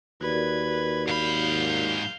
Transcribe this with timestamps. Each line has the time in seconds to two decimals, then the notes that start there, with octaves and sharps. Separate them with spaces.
0.21 D#2 F#4 A#4 B4 D5 G#6
1.08 G#2 F5 B5 G6